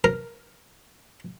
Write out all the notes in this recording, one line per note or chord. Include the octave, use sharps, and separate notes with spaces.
A#4